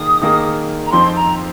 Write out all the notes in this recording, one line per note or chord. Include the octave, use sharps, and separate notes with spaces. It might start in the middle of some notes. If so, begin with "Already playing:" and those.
Already playing: D#3 A#3 G#4 D#6
D#3 A#3 G#4
A#5
F2 F3 C4 D#4 C5 C6
A#5